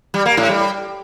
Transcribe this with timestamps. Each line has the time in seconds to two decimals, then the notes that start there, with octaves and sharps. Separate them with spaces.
0.14 G3
0.26 A#3
0.37 A2
0.49 G3